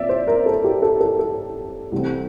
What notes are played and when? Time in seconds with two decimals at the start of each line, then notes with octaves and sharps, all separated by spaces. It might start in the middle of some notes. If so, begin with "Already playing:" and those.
Already playing: A#2 C4 D5 E5
0.09 C5
0.27 A#4
0.46 A4
0.64 G4
0.82 A4
1.01 A4
1.19 A4
1.92 C2 C3 E3 A3 C4